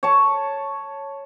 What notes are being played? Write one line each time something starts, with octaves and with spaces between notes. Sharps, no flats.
C#5 A5